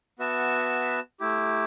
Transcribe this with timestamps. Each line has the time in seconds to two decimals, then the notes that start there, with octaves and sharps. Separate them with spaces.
0.19 B3 F#4 B4 E5 A5
1.20 A3 E4 G4